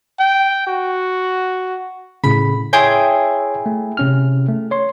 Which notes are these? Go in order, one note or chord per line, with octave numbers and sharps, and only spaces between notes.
G5
F#4
A2 C#3 B5
E4 G#4 C#5 E5 G5 C6
A3
C3 C#4 F6
A3
C#5 C6